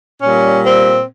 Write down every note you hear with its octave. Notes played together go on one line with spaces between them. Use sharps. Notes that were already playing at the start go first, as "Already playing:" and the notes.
A#2 G3 C#4
C4